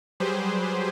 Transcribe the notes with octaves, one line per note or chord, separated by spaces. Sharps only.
F#3 G3 G4 G#4 B4 C5